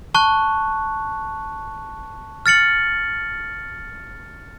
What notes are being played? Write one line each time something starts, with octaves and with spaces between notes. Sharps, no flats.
A5 C#6 F#6
F6 A6 C#7 F#7